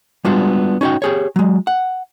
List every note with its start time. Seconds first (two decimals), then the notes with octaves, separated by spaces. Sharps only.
0.25 G3 G#3 B3 D4 F4 F#4
0.81 C#4 D#4 F#4 C#5 G5
1.02 G4 G#4 C#5
1.36 F#3 G#3
1.67 F#5